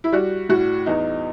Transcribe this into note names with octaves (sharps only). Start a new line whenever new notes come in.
E4
G3 F#4
A2 F#4
E2 D#4